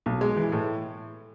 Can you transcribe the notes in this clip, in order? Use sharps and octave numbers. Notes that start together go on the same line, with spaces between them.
B1
G#3
E3
A2